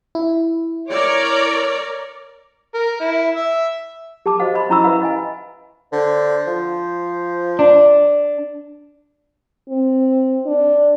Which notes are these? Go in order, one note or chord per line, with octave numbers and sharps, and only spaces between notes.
E4
A#4 C#5 D5 D6
A#4
E4
E5
G4 A5 D6
F#4 C5 D#5 F5
D#5 B5 C6
C#4 E4 A#5 B5 C#6 E6
B4 E5 F5 B5
D#5 F5 G#5
D3 C5
F3
D4
C4
D4